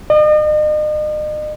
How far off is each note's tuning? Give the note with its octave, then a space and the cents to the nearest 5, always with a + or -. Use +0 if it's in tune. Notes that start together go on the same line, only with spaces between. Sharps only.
D#5 -40